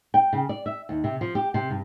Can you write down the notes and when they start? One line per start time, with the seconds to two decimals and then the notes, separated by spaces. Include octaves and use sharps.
0.14 G5
0.33 C#3
0.49 D5
0.66 E5
0.89 D#2
1.04 C3
1.21 F3
1.35 G4
1.54 C3
1.70 G2